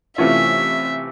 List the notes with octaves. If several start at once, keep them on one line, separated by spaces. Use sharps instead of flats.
C3 E3 A3 C#4 F4 E5